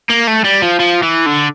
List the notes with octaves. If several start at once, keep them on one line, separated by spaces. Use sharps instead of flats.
A#3
A3
G3
F3
F3
E3
D3